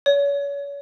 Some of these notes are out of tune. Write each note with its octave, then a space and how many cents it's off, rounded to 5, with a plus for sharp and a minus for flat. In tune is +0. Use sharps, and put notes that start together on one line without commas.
C#5 +35